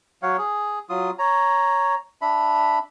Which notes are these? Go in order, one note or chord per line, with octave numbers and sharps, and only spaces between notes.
F#3 C#5 F5 F#5
G#4
F#3 F4 D#6
C#5 A#5
D4 E5 B5